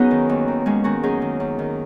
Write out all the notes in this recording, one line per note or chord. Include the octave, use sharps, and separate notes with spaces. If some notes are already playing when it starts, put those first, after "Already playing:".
Already playing: F#2 B3 C#4 D#4 F#4 G#4
D#3
D#2
D#3
D#2 G#3 C#4
D#3 C#4 F#4
F#2 D#4 G#4
D#3
F#2
D#3